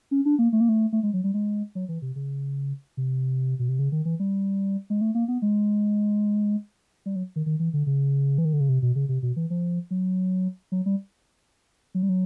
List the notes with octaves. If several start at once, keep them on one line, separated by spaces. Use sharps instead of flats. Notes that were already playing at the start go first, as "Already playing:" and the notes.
C#4
D4
A#3
A3
A#3
A3
A3
G#3
F#3
G3
G#3
F#3
E3
C3
C#3
C3
B2
C3
C#3
D#3
E3
G3
G#3
A3
A#3
B3
G#3
G3
F#3
D#3
D#3
E3
D3
C#3
E3
D#3
D3
C#3
C3
B2
C#3
C3
B2
E3
F3
F#3
F#3
G3
F#3
G3
F#3